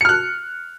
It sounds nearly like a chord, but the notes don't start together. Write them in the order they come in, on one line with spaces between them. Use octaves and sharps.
C#7 F6 F#6